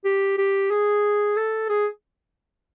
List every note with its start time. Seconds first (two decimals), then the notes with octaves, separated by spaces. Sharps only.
0.04 G4
0.38 G4
0.70 G#4
1.37 A4
1.69 G#4